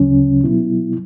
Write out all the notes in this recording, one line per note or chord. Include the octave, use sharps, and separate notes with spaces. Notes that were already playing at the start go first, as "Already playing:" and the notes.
Already playing: D2 C#3 F#3 C#4
B2 F#3 B3 E4